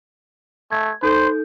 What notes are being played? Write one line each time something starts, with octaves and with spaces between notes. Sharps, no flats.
A3 G#6
D#4 A4 C5 G6